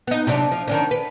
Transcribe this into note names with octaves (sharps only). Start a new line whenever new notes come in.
B3 D#4
C3 F#3 D4
F3
D#3 C#4 D4
B4